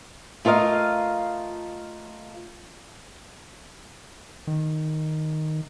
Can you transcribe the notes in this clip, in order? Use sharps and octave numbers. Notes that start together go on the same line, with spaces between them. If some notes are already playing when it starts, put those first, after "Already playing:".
A3 F4 A#4 D#5 F5
D#3